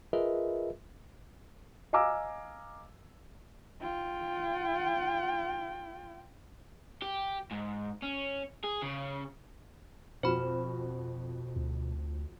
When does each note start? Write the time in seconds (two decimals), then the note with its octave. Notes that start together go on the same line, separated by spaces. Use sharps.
0.13 F4 G#4 A#4 B4 D#5 E5
1.93 D#5 F5 G#5 A#5 D6 E6
3.81 F4 G5
7.02 G4
7.52 G#2
8.03 C#4
8.64 G#4
8.83 C#3
10.23 F2 B2 F#4 C5 B5
11.56 D2